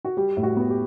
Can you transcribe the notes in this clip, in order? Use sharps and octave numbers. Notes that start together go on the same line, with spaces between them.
F#4
G3 G4
A2
F#4
B3
G4